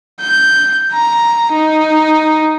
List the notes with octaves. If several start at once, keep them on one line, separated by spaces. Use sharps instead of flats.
G6
A#5
D#4